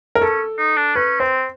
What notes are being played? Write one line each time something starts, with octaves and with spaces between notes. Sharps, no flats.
A#4
C#4 A4
D#4
D4
C#4 B4
C4 C5